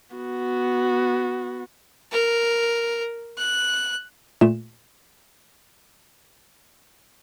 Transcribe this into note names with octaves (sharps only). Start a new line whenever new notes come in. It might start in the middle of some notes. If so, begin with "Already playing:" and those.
B3 F#4
A#4
F#6
A#2 A3 E7